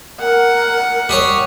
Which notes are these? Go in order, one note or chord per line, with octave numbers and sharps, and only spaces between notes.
A#4 F#5
G3 G#4 C#5